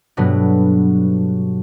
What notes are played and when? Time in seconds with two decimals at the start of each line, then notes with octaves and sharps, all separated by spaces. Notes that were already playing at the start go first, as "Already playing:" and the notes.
0.17 G2 B2 F#3 A3 B3 D4